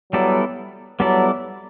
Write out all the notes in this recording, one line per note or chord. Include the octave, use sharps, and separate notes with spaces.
F#3 G3 B3 E4 A4 D5
F#3 G3 B3 E4 A4 D5